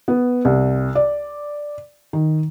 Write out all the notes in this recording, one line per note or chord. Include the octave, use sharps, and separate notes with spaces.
B3
C2
D5
D#3